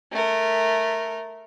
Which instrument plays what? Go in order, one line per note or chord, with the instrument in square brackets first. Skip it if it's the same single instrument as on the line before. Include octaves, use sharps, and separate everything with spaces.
[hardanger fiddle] A3 A#4